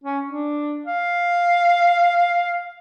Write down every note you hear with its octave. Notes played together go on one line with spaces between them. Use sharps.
C#4
D4
F5